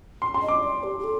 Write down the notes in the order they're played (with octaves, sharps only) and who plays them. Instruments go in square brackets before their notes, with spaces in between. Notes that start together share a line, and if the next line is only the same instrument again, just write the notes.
[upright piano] C6
C6
[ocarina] D#5
[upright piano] D6
[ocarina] D5
G4
G4
A4